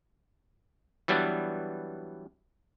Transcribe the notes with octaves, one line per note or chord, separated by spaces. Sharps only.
E3 F#3 G3 B3 D4